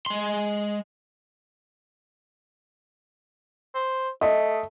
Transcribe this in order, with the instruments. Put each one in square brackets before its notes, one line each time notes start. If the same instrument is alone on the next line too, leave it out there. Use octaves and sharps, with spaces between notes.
[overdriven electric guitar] G#3 C6
[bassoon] C5
[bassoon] A3 [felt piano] D#5